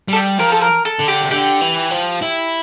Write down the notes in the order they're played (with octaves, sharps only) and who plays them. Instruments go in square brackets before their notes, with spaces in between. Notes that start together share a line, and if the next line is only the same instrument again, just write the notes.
[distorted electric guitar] G3 [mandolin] A4
[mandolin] G4
[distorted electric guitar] F3 [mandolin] A#4
[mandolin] A4
A#4
A4
[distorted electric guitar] D3
[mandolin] G4
[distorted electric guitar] C3
[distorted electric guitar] D3 [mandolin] G4
[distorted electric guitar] E3
F3
E4